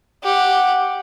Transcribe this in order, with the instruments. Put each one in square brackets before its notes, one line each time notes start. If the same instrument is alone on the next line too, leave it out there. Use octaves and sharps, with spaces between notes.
[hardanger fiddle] G4 F#5